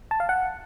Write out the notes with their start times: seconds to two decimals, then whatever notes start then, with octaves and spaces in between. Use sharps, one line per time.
0.11 A5
0.20 F5
0.29 F#5